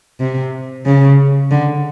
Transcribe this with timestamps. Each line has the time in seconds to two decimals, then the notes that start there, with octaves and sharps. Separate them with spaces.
0.20 C3
0.86 C#3
1.51 D3